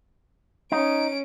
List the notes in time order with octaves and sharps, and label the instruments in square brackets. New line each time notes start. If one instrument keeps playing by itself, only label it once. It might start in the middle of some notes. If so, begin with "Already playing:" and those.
[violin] C#4 D7 [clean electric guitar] D#4